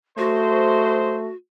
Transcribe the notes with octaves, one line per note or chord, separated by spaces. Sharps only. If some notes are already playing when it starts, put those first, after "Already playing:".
F#3 G#3 A3 F#4 C5